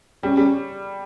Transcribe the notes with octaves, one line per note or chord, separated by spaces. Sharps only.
G3 C#4
G3